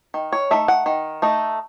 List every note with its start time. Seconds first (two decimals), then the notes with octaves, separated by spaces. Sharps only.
0.14 D#3
0.32 C#5
0.51 A3 D#4 E5
0.68 F#5
0.86 D#3
1.22 A3 D#4